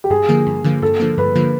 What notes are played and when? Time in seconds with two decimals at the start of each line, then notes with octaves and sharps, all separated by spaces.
0.04 G4
0.10 G2 G#4
0.29 D3 F3 A#3
0.47 G2
0.64 D3 F3 A#3
0.82 G2 A4
1.00 D3 F3 A#3
1.18 G2 B4
1.35 D3 F3 A#3